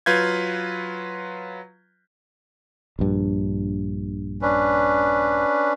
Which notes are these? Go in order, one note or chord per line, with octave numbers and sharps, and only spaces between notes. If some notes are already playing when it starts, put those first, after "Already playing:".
F#3 F4 B4 F5 G6 G#6
A#1 G2
C#4 D4 B4